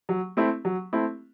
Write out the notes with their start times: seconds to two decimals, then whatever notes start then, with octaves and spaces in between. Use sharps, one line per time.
0.09 F#3
0.37 A3 C4 E4
0.65 F#3
0.93 A3 C4 E4